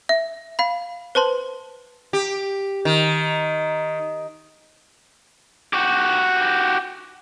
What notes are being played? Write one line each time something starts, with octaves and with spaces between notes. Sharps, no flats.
E5
F5 B5
B4 C5 A5 C6
G4
D#3
F#4 G4